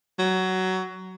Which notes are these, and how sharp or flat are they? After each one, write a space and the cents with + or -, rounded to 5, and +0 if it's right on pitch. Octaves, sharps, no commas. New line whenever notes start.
F#3 +15